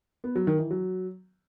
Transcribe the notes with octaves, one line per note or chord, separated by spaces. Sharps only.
B3
F#3
D#3
E3
F#3